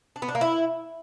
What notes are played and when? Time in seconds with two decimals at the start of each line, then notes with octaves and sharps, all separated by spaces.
0.16 D4
0.22 B3
0.28 D4
0.35 A#3
0.41 E4